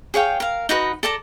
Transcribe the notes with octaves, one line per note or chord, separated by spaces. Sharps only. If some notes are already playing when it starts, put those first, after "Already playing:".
G#4 C#5 F5 G5
A#4 F5
D#4 F#4 B4 D#5
A4 D5 A5 A#5